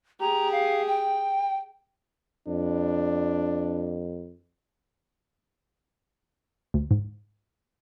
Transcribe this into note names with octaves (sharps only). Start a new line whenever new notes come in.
G4 G#4 A#5
F5
G5
F2 D4
D2
G#2